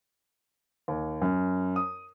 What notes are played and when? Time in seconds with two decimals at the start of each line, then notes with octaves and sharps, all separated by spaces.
0.88 D#2
1.21 F#2
1.76 D#6